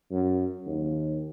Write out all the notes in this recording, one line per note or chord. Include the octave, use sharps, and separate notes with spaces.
F#2
D#2